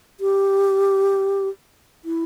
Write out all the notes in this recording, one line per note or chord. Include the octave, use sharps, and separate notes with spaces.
G4
E4